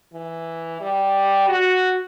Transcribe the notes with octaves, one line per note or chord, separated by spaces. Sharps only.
E3
G3
F#4